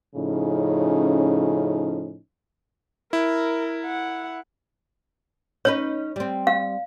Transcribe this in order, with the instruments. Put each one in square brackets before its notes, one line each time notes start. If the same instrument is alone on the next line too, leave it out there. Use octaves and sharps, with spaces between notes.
[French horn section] A2 C#3 F3 C#4 D#4
[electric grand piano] E4 [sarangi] A#4
[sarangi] F#5
[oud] C#4 D#4 B4 [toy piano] C#5
[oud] G3 C4
[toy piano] F5